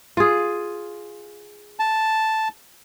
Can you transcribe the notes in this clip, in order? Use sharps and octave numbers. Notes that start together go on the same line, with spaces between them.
F4 G#4
A5